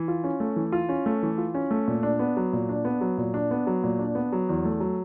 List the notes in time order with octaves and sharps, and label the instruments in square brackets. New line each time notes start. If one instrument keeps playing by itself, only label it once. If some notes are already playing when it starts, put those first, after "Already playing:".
Already playing: [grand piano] E3
F4
C#4
A3
E3
F4
C#4
A3
E3
F4
C#4
A3
A#2
D4
B3
F#3
A#2
D4
B3
F#3
A#2
D4
B3
F#3
A#2
D4
B3
F#3
E2
A3
F#3